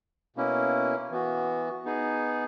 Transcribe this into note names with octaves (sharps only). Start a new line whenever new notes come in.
B2 A#3 C#4 E4
E3 B3 F#4
B3 D#4 G#4